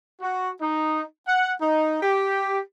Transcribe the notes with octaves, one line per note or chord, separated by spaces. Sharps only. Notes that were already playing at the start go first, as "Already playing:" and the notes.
F#4
D#4
F#5
D#4
G4